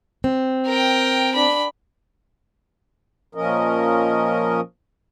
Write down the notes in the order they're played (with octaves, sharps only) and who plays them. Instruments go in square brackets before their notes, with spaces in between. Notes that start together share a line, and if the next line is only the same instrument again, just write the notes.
[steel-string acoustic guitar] C4
[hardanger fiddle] A#4 G5
D4 B5
[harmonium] A#2 F3 C#4 A#4 D#5